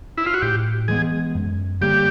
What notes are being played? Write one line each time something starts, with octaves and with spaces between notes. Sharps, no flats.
E4
F4
F#4
A2 G4
E3 G#3 B3 G#4
F#2
D3 G3 A#3 G4